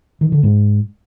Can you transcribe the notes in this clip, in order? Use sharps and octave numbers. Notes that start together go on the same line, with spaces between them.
D#3
D3
G#2